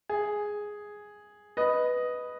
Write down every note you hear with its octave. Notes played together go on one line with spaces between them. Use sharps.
G#4
B4 D#5